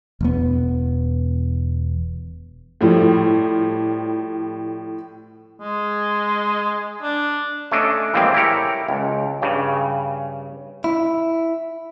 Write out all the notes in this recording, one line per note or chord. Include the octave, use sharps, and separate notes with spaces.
E1 B3
A2 F3 G3
G#3
D4
A3 C#4 D4 D#5
A#2 E3 F3 G3 G#3 C4
E4 G4 A#4 C#5
C#2
G2 C#3
E4